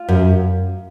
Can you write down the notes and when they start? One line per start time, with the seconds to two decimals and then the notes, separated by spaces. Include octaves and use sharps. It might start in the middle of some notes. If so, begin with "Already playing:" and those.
Already playing: F4
0.08 F#2